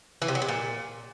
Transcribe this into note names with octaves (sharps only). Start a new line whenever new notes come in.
E3
C3
F#3
C3
A#2